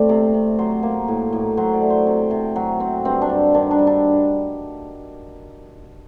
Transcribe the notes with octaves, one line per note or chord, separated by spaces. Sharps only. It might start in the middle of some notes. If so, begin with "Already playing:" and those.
Already playing: A2 A3 C4 C5 D5
C3
C3
F#3 C5
A#3
A2
A2
F#3 C5
D5
A3
C5
C3
C3
F#3
C4
G2 C4
D4
G2
D#3 D4
D4
G3
D4